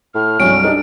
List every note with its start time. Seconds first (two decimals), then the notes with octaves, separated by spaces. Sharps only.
0.15 A2 F6
0.40 C2 G2 F#3 C#4 D7
0.64 D4 D#4 G4 A4